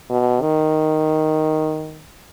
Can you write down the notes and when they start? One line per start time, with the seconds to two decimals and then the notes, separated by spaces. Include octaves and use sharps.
0.10 B2
0.42 D#3